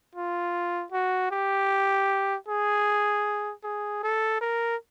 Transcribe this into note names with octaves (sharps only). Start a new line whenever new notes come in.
F4
F#4
G4
G#4
G#4
A4
A#4